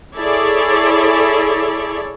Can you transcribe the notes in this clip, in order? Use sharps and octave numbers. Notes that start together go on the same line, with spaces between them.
E4 G#4 A4 C#5 D5